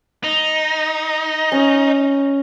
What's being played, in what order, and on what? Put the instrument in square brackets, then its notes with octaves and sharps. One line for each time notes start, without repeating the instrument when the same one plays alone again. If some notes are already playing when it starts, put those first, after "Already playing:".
[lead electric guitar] D#4
[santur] C#4